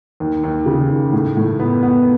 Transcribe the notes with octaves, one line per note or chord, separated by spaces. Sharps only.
D#2
D#2
C#3
D#2
A2
A2
B3
B3